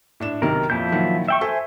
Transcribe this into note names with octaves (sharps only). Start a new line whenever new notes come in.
A2 D4 E7
B1 C3 D#3 A#4
F2 A#2 F3 E4 G6
A#2 D#3 F#3
E5 G5 C#6
A4 C5 E5 G#5